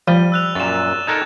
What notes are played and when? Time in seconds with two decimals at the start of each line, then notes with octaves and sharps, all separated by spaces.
0.08 F3 G3 D#7 G7
0.32 E6 F#6 F7
0.55 F#2 A#2 A6 E7
1.07 D#4 A4 A#4 F#6 G#6 E7